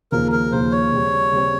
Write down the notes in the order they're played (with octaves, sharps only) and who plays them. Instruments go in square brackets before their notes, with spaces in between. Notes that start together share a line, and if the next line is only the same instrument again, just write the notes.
[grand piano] D#2 C#3 F3 [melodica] A#4
[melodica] A#4
[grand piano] D#2 C#3 F3 [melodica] C5
[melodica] C#5
[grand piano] C#3 G3 C4
C#3 G3 C4